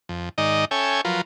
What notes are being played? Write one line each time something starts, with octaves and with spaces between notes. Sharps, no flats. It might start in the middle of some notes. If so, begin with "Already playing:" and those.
F2
G#2 D#3 D#4 D5 D#5
C#4 A4 C#5 E5 G5 G#5
F3 F#3 F4 A#4 B4